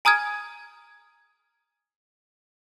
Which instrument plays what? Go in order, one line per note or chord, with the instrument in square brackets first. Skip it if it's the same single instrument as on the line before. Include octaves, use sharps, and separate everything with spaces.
[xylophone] G#5 A#5 D#6 F6 G#6